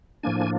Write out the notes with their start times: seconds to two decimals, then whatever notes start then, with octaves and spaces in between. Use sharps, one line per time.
0.23 A2 F3 A#3 D4 G#5